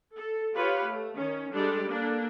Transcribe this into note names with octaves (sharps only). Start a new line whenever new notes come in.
A4
F4 G4 B4 C#5 F5
A3
D#3 C#4
G3 G#3 D4 G4 A4 D5
A#3 D4 A4